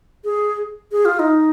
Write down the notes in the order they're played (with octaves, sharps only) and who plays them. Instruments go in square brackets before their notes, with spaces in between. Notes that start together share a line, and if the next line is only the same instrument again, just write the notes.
[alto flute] G#4
G#4
F4
D#4